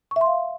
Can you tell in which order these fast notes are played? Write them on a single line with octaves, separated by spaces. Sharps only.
C#6 E5 C6 F5